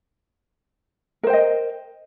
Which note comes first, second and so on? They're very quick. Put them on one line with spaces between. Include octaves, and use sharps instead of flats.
A#4 C5 G5 D#5